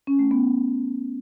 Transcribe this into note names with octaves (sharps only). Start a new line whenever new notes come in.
C#4
A3
B3